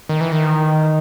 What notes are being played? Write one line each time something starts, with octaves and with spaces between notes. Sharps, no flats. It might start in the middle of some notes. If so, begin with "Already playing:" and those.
D#3
E3
D#3